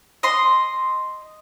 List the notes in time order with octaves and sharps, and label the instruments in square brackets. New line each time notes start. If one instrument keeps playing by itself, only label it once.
[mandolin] D#5 C6